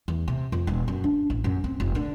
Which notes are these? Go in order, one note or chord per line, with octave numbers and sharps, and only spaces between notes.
E2
C3
F2
E1
F#2
D4
A1
F#2
C4
F1
D3